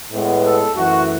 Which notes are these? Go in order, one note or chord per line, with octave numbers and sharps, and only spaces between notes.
A2 G#3 B3
A4
F#2 E3 A3 F#4